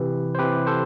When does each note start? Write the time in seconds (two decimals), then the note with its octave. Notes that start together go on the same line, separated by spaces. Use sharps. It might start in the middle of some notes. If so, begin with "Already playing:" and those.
Already playing: C3 E3 G4 B4
0.35 C5
0.39 C3 E3 G4 B4
0.67 A4 C5